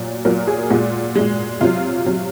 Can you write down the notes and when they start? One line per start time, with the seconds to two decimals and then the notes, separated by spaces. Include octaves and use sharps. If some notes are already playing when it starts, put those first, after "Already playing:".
Already playing: A#2 F#3
0.25 A#2 F#3 A#4
0.47 G#4
0.70 A#2 G#3 F#4
1.15 A#2 G#3
1.61 C3 F#3 F4
2.06 C3 F#3